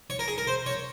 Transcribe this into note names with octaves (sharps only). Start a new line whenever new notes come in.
C#5
A#4
G#4
A#4
C5
C#5